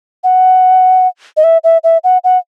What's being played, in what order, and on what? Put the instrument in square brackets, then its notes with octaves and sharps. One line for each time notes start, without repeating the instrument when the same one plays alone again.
[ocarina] F#5
D#5
E5
E5
E5
F#5
F#5